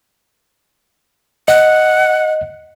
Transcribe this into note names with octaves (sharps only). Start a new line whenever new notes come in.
D#5 F#5